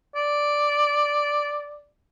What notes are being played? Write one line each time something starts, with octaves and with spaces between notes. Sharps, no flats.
D5